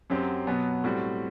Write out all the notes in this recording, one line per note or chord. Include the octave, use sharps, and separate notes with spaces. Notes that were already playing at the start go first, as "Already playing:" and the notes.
F#2 F#3 C4 G4
B2 F#3 B3
A2 G3 C4 F#4